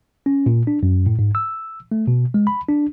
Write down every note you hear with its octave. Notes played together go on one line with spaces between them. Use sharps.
C#4
A#2
D4
F#2
A2
G#2
E6
A3
B2
G#3
B5
D4